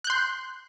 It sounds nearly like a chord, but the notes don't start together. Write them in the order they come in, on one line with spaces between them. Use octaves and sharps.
F#6 G6 C6